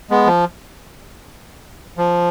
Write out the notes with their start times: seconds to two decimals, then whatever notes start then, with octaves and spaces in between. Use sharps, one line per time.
0.10 G#3 B3
0.27 F3
1.97 F3